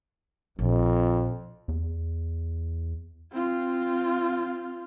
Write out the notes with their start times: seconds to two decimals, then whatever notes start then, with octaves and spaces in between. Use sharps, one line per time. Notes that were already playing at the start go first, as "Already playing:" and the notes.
0.59 A#1 F2
1.68 E2
3.31 C4 F4